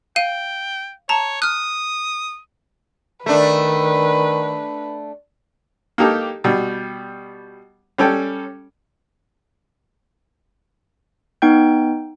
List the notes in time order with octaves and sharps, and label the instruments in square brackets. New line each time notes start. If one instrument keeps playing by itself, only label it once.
[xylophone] F5 D#7 [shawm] G5
[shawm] C#5 [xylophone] A5 A#5
[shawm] D#6 [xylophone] F6 F#6
[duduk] D#3 [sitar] A3 D4 [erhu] B4
[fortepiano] A#3 D#4 G4 A4
B2 G3
G3 C#4 A4 G5
[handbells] B3 D#4 G5 G6